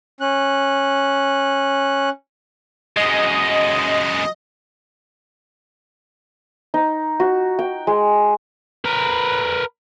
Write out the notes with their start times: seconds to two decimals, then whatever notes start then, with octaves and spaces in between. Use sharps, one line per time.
0.20 C#4 F#6
2.97 F#2 G#3 D#5
6.74 D#4
7.20 F#4
7.59 G5
7.87 G#3
8.85 A#4 B4